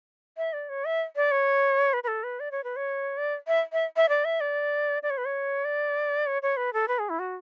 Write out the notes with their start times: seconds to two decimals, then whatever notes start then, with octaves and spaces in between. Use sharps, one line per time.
0.37 E5
0.53 D5
0.69 C#5
0.85 E5
1.16 D5
1.31 C#5
1.93 B4
2.04 B4
2.08 A4
2.24 B4
2.40 D5
2.51 C#5
2.64 B4
2.76 C#5
3.17 D5
3.48 E5
3.73 E5
3.96 E5
4.09 D5
4.25 E5
4.41 D5
5.03 D5
5.10 C#5
5.18 B4
5.25 C#5
5.65 D5
6.26 C#5
6.42 C#5
6.57 B4
6.73 A4
6.88 B4
6.99 G#4
7.09 E4
7.19 F#4